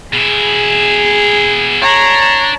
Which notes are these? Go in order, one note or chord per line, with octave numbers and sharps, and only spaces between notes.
B2 E4 G#4
D4 C#5 A#5